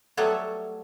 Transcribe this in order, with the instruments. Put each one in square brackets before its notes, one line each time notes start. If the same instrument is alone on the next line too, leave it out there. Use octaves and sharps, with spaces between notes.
[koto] F#3 G3 A3 B3 A4 C#5